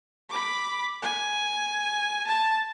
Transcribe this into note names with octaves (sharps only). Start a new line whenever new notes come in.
B5 D6
G#5
A5